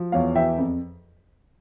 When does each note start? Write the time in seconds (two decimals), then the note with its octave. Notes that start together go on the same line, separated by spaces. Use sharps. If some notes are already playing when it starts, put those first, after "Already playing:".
Already playing: F3
0.12 E2 C#5 F5
0.36 E3 E5 G5
0.58 F2